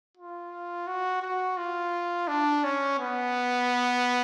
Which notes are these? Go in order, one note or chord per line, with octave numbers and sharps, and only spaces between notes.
F4
F#4
F#4
F4
D4
C#4
B3